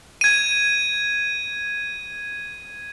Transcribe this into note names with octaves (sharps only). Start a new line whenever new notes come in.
G#6 D#7